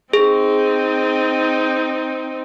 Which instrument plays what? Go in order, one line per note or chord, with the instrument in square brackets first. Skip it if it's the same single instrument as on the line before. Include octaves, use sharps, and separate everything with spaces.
[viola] C4 D#4 [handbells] G#4